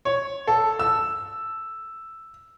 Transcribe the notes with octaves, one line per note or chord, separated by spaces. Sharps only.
C#5
A4
E6